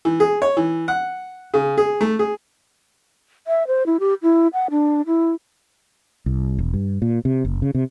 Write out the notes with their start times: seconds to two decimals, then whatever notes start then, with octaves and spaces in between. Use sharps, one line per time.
0.05 E3
0.20 G#4
0.42 C#5
0.57 E3
0.88 F#5
1.54 C#3
1.78 G#4
2.01 A3
2.19 G#4
3.47 E5
3.67 C5
3.86 E4
4.00 G4
4.23 E4
4.53 F#5
4.71 D4
5.07 E4
6.26 C2
6.59 E1
6.74 G2
7.02 A#2
7.25 C3
7.45 F#1
7.62 C#3
7.75 C3